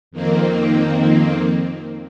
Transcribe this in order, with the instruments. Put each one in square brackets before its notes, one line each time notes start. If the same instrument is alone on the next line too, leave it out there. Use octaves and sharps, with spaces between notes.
[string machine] F2 D#3 A#3 C4